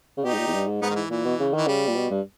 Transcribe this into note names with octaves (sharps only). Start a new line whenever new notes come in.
C#3
B2 D#4 G4
G#2
A#2
E2
G2
G#2
G#2 B3 D#4
D#3
E3
A#2 E3
B2
C#3
D#3 E3
C#3 G3
A#2
B2
G2